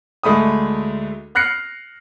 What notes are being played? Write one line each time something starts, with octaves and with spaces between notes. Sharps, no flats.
D2 G#3 A3 B5 D#6
F6 F#6 A#6 C7 C#7